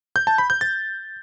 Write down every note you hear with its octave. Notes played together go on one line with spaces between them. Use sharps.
G6
A5
B5
G6
A6